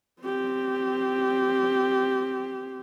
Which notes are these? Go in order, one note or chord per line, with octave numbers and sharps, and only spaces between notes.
C4 G4